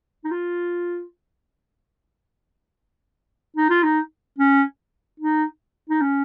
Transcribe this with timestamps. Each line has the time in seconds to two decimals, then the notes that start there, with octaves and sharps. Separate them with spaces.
0.25 D#4
0.31 F4
3.56 D#4
3.70 F4
3.83 D#4
4.38 C#4
5.20 D#4
5.89 D#4
6.02 C#4